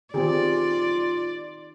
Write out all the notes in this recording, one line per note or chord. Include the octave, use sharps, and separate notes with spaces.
D#3 C4 F4 G4 G#4 D5